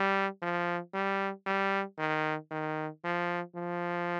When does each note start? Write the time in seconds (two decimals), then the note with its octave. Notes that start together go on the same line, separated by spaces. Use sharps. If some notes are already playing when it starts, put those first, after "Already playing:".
Already playing: G3
0.42 F3
0.94 G3
1.46 G3
1.98 D#3
2.51 D#3
3.04 F3
3.55 F3